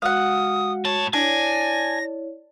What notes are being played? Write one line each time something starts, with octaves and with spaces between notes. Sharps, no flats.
G#3 F#4 F5 F#5 D#6
A2 C#5 A5
D4 E4 C#5 G#5 A#6